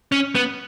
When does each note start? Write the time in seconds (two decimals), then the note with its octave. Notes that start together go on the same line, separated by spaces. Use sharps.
0.12 C#4
0.35 B3